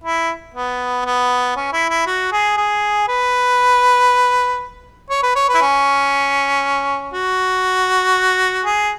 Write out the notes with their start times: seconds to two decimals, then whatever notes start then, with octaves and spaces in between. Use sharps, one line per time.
0.04 E4
0.54 B3
1.05 B3
1.56 C#4
1.73 E4
1.90 E4
2.06 F#4
2.32 G#4
2.57 G#4
3.08 B4
5.10 C#5
5.23 B4
5.36 C#5
5.49 B4
5.55 E4
5.61 C#4
7.14 F#4
8.65 G#4